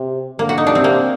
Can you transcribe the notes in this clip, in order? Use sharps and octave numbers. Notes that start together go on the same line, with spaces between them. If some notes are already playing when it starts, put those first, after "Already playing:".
Already playing: C3
D3 A#3
F#4
D#4
C3 D4
C4
A#3